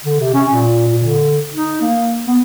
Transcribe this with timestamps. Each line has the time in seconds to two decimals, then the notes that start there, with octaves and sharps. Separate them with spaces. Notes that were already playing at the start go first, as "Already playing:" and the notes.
0.04 D3
0.20 C3
0.34 C#4
0.52 A#2
0.88 A#2
1.04 D3
1.54 D#4
1.81 A#3
2.27 B3